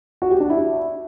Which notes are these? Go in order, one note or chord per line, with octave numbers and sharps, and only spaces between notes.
F#4
G4
D4
E4